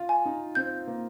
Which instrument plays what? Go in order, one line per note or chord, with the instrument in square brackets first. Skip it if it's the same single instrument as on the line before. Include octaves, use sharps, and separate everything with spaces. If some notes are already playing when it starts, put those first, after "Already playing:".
Already playing: [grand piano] F4
[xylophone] G#5
[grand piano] D#4
[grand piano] C4 [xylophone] G6
[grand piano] A#3